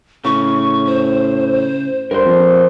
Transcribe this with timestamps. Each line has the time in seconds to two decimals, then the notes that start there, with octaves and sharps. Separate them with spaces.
0.25 A2 C#3 C#6
0.87 C5
2.11 G2 A#4 C5
2.25 F2